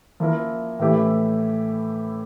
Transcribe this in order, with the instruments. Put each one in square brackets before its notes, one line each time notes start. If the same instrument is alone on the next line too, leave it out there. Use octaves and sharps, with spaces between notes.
[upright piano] F3 A#3 E4 A#4
A2 E3 A3 E4 G4